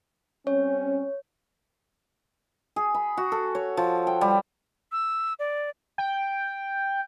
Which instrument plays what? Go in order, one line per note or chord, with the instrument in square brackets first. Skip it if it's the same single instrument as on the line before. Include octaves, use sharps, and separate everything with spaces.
[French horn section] G3 C4 C#4 [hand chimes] C#5
[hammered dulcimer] G#4
B5
F#4
A4
C#5
F3
G5
G3
[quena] E6
D5
[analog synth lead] G5